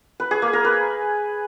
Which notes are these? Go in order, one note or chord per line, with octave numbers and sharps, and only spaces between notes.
B4
G#4
A#3
A#4
B4